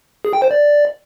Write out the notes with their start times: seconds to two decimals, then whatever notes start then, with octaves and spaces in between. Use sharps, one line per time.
0.25 G#4
0.33 G5
0.42 C5
0.51 D5